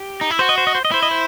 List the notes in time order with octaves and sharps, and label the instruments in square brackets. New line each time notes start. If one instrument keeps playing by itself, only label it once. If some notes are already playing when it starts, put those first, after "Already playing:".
Already playing: [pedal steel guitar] G4
[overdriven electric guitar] D#4
E4
[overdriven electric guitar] F#4 [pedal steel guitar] C5
[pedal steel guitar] D#5
C5
D#5
C5
D#5
[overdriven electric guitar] E4 [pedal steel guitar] C5
[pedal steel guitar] D#5
C5